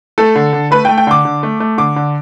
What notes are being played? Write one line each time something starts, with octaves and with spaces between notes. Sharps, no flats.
A3 A4
D3
D3
A3 B4
G5
A3
G5
D3 D6
D3
A3
A3
D3 D6
D3